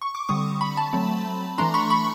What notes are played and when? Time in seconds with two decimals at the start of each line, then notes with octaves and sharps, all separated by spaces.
0.02 C#6
0.15 D6
0.29 D3 G3 C4 C#6 D#6
0.61 B5 C#6
0.77 A5 B5
0.93 F#3 A3 C4
1.58 E3 A3 D4 A#5 C6
1.74 B5 C#6
1.90 B5 C#6